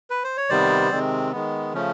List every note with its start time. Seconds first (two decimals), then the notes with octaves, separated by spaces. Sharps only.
0.10 B4
0.24 C5
0.37 C#5
0.49 C3 D#3 G3 B3 C5 D5
0.91 C3 D#3 G#3 C4
1.32 D#3 G#3 B3
1.74 C#3 F3 A3 C#4